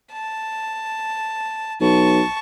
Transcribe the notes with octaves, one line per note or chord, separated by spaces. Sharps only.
A5
B1 A5 C#6